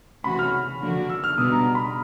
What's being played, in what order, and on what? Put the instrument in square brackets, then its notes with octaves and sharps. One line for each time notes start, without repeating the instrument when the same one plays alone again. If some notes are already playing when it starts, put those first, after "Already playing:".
[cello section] C3 E3 A3 C#4 F#4 [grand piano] B5
[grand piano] F6
[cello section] D3 F3 A#3 D4 F#4
[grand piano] E6
F6
[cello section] B2 G3 B3 D4 [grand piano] D#6
[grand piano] A#5
B5